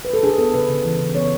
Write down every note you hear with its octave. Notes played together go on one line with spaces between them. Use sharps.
B4
A4
D4 G#4
B3 A4
C#3 B4
C#3
E3
C#3
B3 C#5